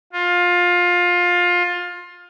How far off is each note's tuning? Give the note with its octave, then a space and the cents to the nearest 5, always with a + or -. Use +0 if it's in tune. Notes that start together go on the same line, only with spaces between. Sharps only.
F4 +20